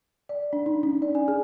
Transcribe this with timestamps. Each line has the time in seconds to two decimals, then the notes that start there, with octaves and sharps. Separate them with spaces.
0.29 D5
0.53 D4
0.66 D#4
0.83 C#4
1.02 D5
1.15 G#5
1.28 G#4